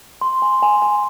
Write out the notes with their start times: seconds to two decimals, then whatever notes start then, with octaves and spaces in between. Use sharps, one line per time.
0.21 C6
0.42 G#5
0.63 G#5
0.82 G#5